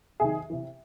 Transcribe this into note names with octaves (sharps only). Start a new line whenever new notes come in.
C3 D#3 G#4
C3 E3